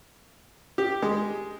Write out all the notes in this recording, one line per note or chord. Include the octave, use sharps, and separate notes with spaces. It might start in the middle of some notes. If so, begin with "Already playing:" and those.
G4
G#3